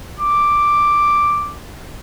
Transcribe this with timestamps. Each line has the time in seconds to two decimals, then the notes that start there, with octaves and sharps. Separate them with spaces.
0.20 D6